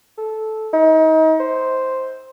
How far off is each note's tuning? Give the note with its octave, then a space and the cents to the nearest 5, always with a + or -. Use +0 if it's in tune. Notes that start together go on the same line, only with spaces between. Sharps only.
A4 -10
D#4 +35
C5 +0